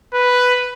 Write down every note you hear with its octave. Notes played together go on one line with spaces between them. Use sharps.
B4